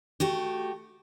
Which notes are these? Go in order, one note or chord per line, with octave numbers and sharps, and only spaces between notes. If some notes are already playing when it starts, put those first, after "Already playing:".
A3 F#4 G4